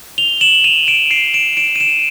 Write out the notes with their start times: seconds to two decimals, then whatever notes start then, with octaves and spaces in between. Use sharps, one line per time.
0.18 F7 G7
0.41 E7 F#7
0.64 D#7 F7
0.87 D7 E7
1.11 C7 D7
1.34 D7 E7
1.57 D7 E7
1.76 D#7
1.80 D7 E7